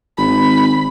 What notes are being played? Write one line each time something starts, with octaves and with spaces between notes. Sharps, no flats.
G#1 B5